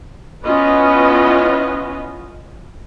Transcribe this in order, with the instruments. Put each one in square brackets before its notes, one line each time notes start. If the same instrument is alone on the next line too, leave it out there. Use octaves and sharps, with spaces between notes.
[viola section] B3 C#4 E4 F4 B4 D#5